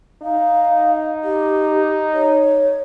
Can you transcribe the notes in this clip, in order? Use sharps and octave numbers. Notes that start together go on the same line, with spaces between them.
D#4 F5
G4
C#5